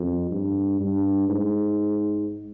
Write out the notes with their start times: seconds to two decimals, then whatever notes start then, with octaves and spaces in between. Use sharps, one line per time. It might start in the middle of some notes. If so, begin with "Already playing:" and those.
Already playing: F2
0.31 G2
0.80 G2
1.29 G#2